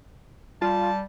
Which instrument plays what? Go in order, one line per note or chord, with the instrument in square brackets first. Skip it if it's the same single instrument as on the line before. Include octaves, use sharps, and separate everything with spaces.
[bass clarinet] G3 [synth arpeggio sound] F4 [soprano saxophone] A5